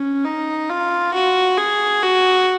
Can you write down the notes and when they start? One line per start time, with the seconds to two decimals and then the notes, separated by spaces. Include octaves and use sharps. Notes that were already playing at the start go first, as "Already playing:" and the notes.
Already playing: C#4
0.24 D#4
0.69 F4
1.14 F#4
1.58 G#4
2.03 F#4